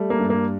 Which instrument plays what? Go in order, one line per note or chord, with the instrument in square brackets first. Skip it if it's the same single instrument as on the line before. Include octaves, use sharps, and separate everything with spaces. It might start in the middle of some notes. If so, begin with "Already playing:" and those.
Already playing: [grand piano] G3 A3
[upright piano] A#3
[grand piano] G2
[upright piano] A#3